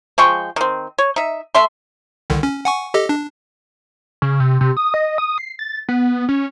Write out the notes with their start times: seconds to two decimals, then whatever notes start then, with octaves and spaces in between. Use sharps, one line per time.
0.18 F3 G#3 G5 C#6
0.56 D#3 C4
0.98 C#5
1.16 D#4 E5
1.55 A3 E5 C6
2.30 C2 D3 D#3
2.43 C#4
2.65 F#5 G#5 C#6
2.94 G4 A4 D#5
3.09 D4
4.22 C#3
4.40 C3
4.61 C3
4.77 D#6
4.94 D#5
5.18 D#6
5.38 C7
5.59 A6
5.89 B3
6.29 C#4